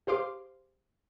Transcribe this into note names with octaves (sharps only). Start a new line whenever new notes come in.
G4 G#4 C5 F5 C6 D6